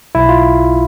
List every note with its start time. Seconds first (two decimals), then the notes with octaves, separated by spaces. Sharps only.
0.15 B1 E4
0.29 F4